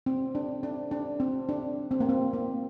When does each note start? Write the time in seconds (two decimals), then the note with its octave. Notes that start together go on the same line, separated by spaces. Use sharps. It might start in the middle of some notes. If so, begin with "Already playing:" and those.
0.06 C4
0.35 D4
0.63 D4
0.91 D4
1.20 C4
1.49 D4
1.91 C4
2.00 A#3
2.09 C4
2.33 A#3